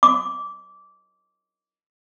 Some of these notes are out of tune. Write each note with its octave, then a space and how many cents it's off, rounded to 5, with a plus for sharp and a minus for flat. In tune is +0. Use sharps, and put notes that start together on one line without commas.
D6 -20